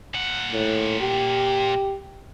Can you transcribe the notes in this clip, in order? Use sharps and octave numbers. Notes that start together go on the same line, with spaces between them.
A#2 F#5
A2
G4